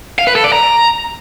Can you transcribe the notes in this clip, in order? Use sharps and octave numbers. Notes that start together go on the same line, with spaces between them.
F5
B4
A4
D5
A#5